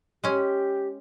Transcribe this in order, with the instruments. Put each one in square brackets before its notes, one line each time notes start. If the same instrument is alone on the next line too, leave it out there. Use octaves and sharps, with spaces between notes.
[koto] G#3 C#4 [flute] G4